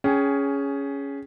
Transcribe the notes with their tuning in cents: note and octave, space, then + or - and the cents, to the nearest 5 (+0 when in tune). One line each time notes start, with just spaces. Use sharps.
C#4 +10 G#4 +0 G5 -10